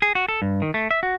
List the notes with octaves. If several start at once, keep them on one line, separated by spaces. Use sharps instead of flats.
G#4
F#4
A4
G2
D#3
A3
E5
F#4